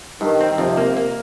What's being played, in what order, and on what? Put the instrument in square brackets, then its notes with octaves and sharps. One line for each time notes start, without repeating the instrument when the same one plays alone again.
[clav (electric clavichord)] G2 [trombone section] D#3
[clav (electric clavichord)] C4
[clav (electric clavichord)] F2 [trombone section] C3
[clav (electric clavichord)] A#3
A#3